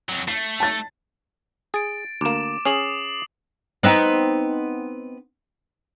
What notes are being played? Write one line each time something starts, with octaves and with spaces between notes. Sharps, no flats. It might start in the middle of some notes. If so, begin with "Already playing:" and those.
F2 F#3
A3 C7
A5 A6
G#4 A6 D7
D2 A#3 D6 E7
C#4 G#4 D#6 C7 F#7
B3 C4 D#4